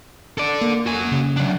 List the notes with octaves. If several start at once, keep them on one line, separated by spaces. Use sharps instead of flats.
A4 D5
A#3
F#4 G#5
C#3
F#3 D4